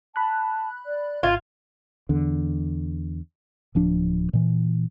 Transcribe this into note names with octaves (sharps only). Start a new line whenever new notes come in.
A5 B5 F#6
D5
G#1 F4 G#6
E2 D3
D1 F3 D4
A#2 E3